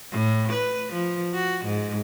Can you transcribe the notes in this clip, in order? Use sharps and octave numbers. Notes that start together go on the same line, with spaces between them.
A2
B4
F3
F#4
G#2